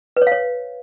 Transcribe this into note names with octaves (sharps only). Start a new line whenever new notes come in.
B4
C#5
F5
C#5